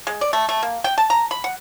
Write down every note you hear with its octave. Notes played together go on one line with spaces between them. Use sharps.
G#3
D5
A3
A3
A#3
G5
A5
A#5
B5
F#5